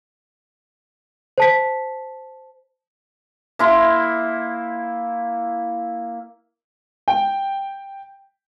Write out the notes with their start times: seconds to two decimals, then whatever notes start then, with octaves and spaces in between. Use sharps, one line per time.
1.38 C5 A5 B6
3.59 A#3 E4 C6
7.08 G5